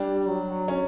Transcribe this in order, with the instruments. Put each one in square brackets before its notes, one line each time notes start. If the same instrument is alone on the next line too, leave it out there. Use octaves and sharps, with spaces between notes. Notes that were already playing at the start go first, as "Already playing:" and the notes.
Already playing: [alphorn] G3 [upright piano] D4
[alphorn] F#3
[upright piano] C#4